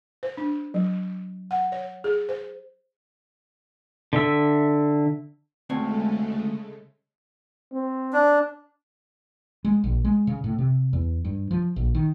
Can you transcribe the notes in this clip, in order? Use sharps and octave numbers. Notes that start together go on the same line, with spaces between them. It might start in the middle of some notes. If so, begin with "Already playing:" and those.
C5
D4
F#3
F#5
C#5
G#4
C5
D3 E5
D2 C#3 G#3 A3 C4 C#5
C4
D4
G#3
A#1
G#3
C#3
A2
C3
E2
G2
F3
A#1
D#3